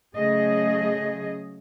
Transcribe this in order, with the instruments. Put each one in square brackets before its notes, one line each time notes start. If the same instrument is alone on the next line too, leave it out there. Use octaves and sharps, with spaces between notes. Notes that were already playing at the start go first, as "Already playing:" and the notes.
[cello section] C#3 F#3 A3 G#4 D#5